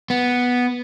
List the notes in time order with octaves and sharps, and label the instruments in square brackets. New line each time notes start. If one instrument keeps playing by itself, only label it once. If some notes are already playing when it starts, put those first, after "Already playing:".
[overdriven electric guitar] B3